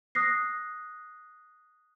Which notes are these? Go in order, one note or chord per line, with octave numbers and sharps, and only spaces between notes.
D#6 F#6 A#6 C7